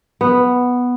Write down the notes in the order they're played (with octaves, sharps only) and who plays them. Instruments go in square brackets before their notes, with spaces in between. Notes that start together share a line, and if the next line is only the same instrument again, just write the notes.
[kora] B3